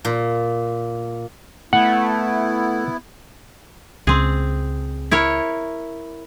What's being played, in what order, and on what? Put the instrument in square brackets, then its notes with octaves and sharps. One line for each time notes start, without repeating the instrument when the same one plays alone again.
[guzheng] A#2
[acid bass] A3 [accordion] B3 E4 [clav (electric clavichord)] F#5
[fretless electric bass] C#2 [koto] C4 G#4
[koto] E4 A#4 C#5